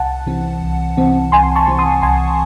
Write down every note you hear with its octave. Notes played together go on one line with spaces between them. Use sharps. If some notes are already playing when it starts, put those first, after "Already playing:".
Already playing: C2 F#5 A5
C3 E3 C4
C2
C3 E3 C4
C2 G#5 C6
A5 C#6
C3 E3 C4
C6 D#6
C2 G#5 C6